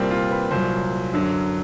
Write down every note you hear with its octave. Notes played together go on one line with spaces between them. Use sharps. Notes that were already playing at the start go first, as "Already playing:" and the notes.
Already playing: C2 A#2 G3 A#3 C4
F4
B4
C2 A#2 F#3 C5
F#2 D3 F#3